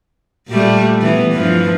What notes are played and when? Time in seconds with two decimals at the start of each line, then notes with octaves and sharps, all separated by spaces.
0.48 A#2 G3 A3
1.01 E3 B3
1.33 G2 E3 F3